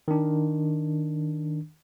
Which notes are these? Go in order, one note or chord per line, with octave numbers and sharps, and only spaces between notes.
D#3 D4